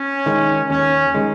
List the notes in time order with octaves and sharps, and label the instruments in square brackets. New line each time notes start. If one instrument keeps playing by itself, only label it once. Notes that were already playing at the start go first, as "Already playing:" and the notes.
Already playing: [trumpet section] C#4
[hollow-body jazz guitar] D#3 G#3
[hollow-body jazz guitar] D#2 [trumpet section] C#4
[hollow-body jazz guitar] D#3 G#3